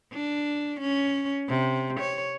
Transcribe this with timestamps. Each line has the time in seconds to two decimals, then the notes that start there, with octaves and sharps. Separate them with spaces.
0.13 D4
0.81 C#4
1.49 C3
2.01 C#5